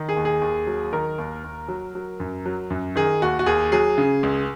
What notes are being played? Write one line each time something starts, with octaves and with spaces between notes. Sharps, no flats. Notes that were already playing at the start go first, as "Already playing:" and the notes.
Already playing: D#3
G#4
D#2
G#4
D#2
F#3
D#3 A#4
D#2
D#2
F#3
F#3
F#2
F#3
F#2
D#3 G#4
D#2 F#4
F#4
D#2 G#4
F#3 G#4
C#3
C#2